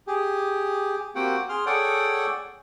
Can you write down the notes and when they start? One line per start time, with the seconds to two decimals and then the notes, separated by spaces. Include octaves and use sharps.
0.07 G4 G#4
1.15 A#3 C4 F#4 G4 F#5 G5
1.49 G#4 C6 F6
1.66 G#4 A4 C#5 D5 F#5 G5